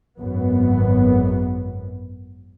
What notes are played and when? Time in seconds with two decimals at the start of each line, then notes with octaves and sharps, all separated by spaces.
0.19 G#1 F#2 B3